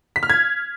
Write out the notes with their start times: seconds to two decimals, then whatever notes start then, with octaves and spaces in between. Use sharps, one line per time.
0.16 B6
0.23 F6
0.30 G#6